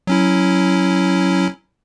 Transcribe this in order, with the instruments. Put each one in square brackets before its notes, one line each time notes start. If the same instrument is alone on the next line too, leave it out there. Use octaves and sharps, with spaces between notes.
[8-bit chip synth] F#3 C#4 E4